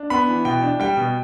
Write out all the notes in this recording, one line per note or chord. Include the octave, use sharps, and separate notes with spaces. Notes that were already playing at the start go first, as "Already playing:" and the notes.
Already playing: D4
B3 B5
E3
B2 G5
D4
G3 G5
B2